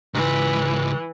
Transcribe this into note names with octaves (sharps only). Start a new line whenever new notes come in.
C#2 G#2 E3